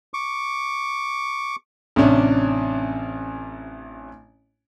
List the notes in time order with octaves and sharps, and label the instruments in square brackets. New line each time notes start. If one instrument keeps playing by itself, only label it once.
[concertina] C#6 D6
[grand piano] A1 C3 C#4 D4